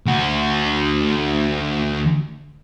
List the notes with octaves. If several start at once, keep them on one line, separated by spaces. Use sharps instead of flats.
D2 F#4